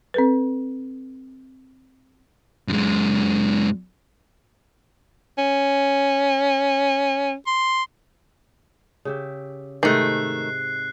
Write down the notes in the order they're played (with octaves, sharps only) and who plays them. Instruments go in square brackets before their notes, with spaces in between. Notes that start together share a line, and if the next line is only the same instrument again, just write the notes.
[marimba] C4 A4 B4
[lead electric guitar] F#2 G#3
[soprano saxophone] C#4
C6
[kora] C#3 G4 E5
[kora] G#2 C3 G#3 [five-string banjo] D#3 A3 [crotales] F#6 C7